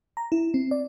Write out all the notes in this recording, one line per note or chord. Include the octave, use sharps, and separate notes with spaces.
A#5
E4
C4
D5